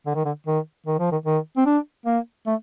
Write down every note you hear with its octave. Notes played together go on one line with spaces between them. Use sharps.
D3
D#3
D3
D#3
D#3
F3
D#3
D#3
C4
D4
A#3
A3